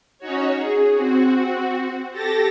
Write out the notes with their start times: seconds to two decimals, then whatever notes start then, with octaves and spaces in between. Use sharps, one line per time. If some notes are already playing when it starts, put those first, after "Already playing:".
0.19 C#4 D#4 F#4 C#5
0.54 G#4
0.94 C4 F#4
2.11 G4 A4 A6 A#6